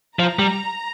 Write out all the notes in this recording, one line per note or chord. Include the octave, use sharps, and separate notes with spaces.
F3 A#5
G3